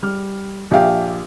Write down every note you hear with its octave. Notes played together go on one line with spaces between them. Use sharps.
G3 F6
A#1 G4 E5 F5 G5